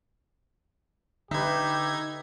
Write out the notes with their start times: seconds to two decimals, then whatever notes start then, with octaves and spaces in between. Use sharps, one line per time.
1.31 D3 D#4 G4 B4 E5 G#6